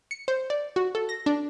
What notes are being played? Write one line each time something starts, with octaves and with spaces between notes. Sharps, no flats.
C#7
C5
D5
F#4
A4
A#6
D4